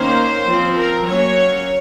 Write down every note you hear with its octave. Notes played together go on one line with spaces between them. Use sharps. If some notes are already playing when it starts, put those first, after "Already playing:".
Already playing: D#3 A#3 C#4 C5
F3 C4
A#4
F#3 A#3 C#4 C#5